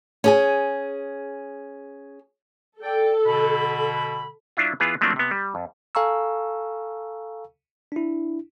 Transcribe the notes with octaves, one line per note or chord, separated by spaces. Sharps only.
C#4 G#4 G#5
A4 D5 G5
B2 D3 B5
F#3 D4 E4 F4
E3 B3 F4 G#4
F3 F#3 A3 A#3 C4 D4
C3 B3
G3
F2
A4 F5 G#5 A#5 C#6 E6
D4 E4